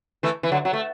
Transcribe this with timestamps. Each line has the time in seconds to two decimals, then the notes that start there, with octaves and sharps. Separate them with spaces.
0.23 E3 A3
0.43 E3
0.52 D3 F#3
0.65 F#3
0.73 A3